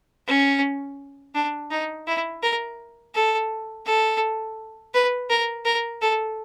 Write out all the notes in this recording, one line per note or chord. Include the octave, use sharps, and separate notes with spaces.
C#4
D4
D#4
E4
A#4
A4
A4
B4
A#4
A#4
A4